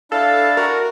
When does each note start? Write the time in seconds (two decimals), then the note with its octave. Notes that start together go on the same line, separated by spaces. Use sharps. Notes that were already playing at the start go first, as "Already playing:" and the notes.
0.12 D4 E4 A4 F5 A5
0.57 F#4 A#4